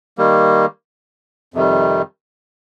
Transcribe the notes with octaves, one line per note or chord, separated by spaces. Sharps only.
D#3 G3 A#3
F2 C3 D#3 G3